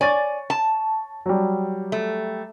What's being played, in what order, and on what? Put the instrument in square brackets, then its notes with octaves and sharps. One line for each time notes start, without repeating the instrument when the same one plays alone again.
[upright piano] C#5 C#6 A6 [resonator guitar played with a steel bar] D5 G#5
[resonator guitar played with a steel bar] A5
[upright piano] F#3 G3
[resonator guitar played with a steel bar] A3